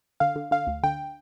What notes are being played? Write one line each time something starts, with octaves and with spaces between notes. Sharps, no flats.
D3 F5
D3
D3 F5
D2
D3 G5